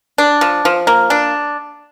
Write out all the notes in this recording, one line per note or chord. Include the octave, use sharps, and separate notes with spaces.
D4
F3
F3
A#3
D4